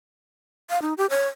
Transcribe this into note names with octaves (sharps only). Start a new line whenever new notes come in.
F5
D#4
G4
C#5